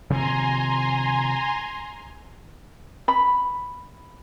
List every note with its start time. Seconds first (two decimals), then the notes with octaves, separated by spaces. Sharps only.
0.10 C3 D#3 F3 G#5 A#5 C6
3.08 B5